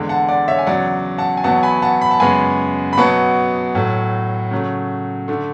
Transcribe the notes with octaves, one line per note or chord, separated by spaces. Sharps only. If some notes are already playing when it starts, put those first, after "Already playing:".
Already playing: E2 D3 G#3
F#5 A5
D5 F#5
C#5 E5
G#5
E2 C#3 F#3 D5 F#5
F#5 A5
G#5
E2 B2 F#3 B3 F#5 A5
G#5 B5
F#5 A5
B5
A5
F#2 C#3 G#3 B3 G#5 B5
B5
B2 F#3 B3 F#5 A5
A2 F#3 A3
C#3 F#3 A3
D3 A3